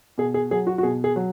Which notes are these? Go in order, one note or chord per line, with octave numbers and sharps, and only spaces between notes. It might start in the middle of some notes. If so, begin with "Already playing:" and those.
B2 G#4
G#4
F#3 G#4
F#4
F#4
B2 G#4
G#4
F#3